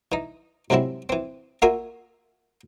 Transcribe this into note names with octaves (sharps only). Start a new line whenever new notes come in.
E3 D#4
G#2 C3 F#3 G#3 C4 E4
E3 C4
A#3 F4 F#4 A#4 E5 G#5